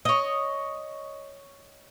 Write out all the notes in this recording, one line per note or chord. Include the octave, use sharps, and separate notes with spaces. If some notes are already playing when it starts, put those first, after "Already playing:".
C#5 D#5